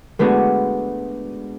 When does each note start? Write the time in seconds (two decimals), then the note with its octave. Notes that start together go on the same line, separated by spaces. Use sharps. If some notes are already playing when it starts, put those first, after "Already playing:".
0.19 G#3 A3 B3 D4 F#4